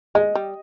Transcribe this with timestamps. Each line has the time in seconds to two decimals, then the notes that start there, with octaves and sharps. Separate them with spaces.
0.15 G#3 D#5
0.35 G3